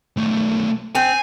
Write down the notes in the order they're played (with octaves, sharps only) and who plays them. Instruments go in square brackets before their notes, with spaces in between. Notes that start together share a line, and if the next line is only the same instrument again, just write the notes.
[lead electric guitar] B1 A3
[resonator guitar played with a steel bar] C4 [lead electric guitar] G#5